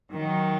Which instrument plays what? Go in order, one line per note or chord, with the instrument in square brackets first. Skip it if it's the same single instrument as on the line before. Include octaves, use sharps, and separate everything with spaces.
[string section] D#3 F#3